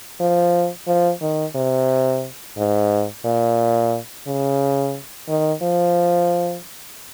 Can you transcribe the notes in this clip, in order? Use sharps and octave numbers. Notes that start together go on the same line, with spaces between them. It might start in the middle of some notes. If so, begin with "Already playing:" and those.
F3
F3
D#3
C3
G#2
A#2
C#3
D#3
F3